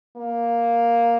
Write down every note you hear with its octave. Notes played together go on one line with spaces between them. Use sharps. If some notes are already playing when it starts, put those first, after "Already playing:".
A#3